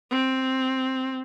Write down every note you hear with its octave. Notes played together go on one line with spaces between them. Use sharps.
C4